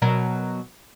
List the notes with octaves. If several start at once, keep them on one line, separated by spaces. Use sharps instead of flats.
B2 F#3 A#4